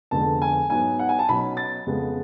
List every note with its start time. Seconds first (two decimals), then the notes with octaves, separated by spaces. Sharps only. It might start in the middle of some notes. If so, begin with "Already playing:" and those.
0.11 F1 F2 D3 G#3 B3 A5
0.42 G#5
0.70 G#2 F#3 B3 G#5
0.99 F#5
1.09 G#5
1.19 A5
1.29 B1 B2 F#3 C#4 B5
1.57 A6
1.87 F2 C#3 G#3 B3